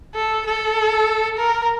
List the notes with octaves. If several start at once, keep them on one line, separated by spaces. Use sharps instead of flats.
A4
A4
A#4